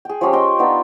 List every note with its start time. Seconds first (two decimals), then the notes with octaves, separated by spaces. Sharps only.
0.05 G#4 G5
0.21 F3 G#3 C#4 G4
0.33 C5 D#5 G5 C#6
0.59 B3 D4 D#4 F4